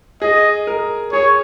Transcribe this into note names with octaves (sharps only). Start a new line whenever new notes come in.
G#4 D#5
A#4
G#4 C#5